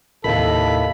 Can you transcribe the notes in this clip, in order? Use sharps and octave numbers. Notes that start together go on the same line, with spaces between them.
D#2 A2 C3 A4 A#4 D#5 F5 B5